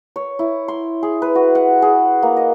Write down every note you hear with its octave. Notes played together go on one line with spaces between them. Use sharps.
C#5
E4
C6
G#4
B4
F#4
F#5
G#4
A#3
D#5